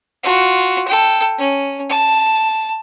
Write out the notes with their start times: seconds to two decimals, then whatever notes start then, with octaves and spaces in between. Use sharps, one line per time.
0.24 F4 F#4
0.88 A4 G5
1.38 C#4
1.90 A5